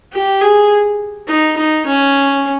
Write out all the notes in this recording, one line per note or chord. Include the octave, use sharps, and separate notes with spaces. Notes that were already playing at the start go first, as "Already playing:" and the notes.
G4
G#4
D#4
D#4
C#4